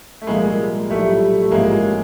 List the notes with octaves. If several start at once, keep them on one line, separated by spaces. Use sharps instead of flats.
A3
C2 A#2 F3 G#3 A#3
G#3
B1 A2 F3 G3 A3
A3
A1 A2 F3 G#3 A#3